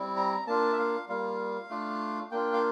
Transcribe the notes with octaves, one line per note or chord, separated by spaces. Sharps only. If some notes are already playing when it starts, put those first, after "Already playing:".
Already playing: G3 C4 E4
A#5
A#3 D4 F4 A5
E5
F5
G3 A#3 F4 F5
A3 D4 F4
A#3 D4 F4 G5
F5